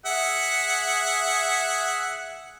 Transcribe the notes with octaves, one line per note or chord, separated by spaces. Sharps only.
G#4 E5 F#5